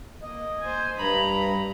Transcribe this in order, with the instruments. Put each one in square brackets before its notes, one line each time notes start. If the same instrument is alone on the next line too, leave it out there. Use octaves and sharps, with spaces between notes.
[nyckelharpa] A#3 [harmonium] D#5
[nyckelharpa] C5 G#5
[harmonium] G2 [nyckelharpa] A#5 B5